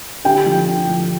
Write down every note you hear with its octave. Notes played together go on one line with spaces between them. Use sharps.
D3 G4 G5
F3
D3
F3